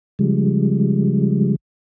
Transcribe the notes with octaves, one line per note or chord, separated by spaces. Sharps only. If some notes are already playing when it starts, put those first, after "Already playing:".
C#3 F3 G3 G#3